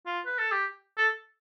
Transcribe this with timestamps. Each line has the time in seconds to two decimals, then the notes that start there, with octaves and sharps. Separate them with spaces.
0.06 F4
0.26 B4
0.38 A4
0.52 G4
0.98 A4